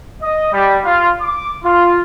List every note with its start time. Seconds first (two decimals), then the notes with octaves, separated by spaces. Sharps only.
0.22 D#5
0.52 G3
0.84 F4
1.22 D6
1.64 F4